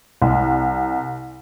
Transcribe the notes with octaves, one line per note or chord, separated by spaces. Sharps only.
C2